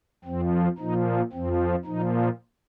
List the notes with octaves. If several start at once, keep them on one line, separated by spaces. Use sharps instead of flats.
F2 F3 C4
A#2 F3 D#4
F2 F3 C4
A#2 F3 D#4